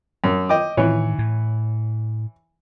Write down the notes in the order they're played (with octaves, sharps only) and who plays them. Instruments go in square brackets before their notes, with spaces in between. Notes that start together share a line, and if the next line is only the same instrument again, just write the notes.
[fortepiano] F#2
D#5 G5 D6
[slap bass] A2 D#3 [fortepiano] E3 C#5
[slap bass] A2